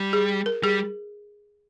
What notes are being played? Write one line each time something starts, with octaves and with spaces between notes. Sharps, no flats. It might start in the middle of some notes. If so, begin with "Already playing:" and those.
Already playing: G3
G#4
A#4
G3 G#4